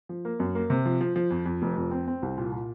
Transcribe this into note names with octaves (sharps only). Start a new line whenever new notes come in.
F3
A#3
F#2
A#3
C3
F3
F3
F3
F2
F2
F1
F2
C4
C4
C2
A#2
A#2